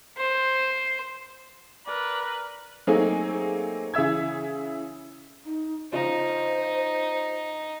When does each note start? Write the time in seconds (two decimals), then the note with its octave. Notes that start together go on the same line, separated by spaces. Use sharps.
0.18 C5
1.87 A#4 B4 D5
2.87 F#3 A3 A#3 C4 D#4 G#4
3.94 C#3 E3 E5 E6 G#6
5.46 D#4
5.92 C#3 F3 D#4 C5 D#5